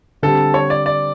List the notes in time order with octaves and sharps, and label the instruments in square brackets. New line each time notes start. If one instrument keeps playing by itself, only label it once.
[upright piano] D3 G3 C4 [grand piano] A4
[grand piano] C#5
D5
D5